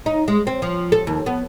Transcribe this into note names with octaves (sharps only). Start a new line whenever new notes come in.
D#4
G#3
C4
F3
A4
D#2
B3